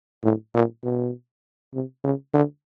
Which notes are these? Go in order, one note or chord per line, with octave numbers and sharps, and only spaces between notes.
A2
A#2
B2
C3
C#3
D3